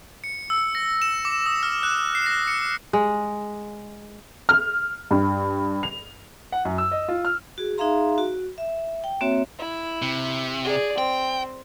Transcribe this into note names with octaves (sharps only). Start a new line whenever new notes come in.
C#7
E6
A#6
E7
D6
D#6
F6
F#6
C7
A#6
C#7
G#3
F6
G2
F7
F#5
F#2
E6
D#5
F4
F6
F#4 G#4
D#4 G#4 E5 F5 A#5 C6
F#4
E5
G5
A#3 C4 F#4 C#5 E5
E4
C3
G#4 D5
C4 G5